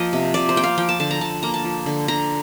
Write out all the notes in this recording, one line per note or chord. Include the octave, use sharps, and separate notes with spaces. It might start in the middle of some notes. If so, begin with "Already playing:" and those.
Already playing: F3 A#3 D#5 F5
C3
C3 D5
C5
A#3 G5
F5
F3 G5
A5
D3 A5
A#5
D3 A5
A#3 A#5
A5
F3
D3
D3 A#5